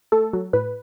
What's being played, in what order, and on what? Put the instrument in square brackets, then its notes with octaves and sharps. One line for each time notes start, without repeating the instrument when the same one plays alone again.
[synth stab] A3 A4
F#3
A2 B4